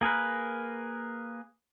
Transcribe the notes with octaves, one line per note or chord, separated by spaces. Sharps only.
A#3 G#4 A#4 B4